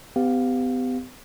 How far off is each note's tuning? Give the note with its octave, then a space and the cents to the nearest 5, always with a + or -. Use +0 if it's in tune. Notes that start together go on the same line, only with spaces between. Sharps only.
B3 +40 G4 +5 F5 +5